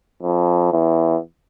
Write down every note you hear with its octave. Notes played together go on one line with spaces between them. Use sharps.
F2
E2